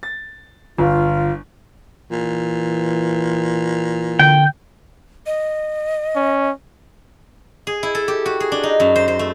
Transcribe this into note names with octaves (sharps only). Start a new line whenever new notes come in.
A6
G1 F4
A#2 E3
D3 G5
D#5
C#4
G#4
E4
A4
G4
F#4
G#4
D4
D#4
F#2
C5
C5
A3